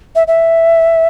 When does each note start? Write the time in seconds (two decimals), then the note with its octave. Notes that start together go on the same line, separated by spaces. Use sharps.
0.15 E5
0.27 E5